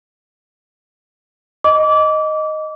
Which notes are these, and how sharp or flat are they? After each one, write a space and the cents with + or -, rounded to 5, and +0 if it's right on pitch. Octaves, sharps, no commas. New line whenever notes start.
D#5 +0 D6 -25